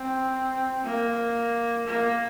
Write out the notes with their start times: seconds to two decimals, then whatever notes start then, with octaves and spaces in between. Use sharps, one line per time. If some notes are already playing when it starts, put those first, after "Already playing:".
Already playing: C4
0.83 A#3
1.87 A#3